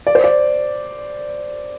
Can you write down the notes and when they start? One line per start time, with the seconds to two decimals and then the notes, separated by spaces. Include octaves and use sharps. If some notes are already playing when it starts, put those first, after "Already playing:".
0.07 D5
0.15 C5
0.24 D5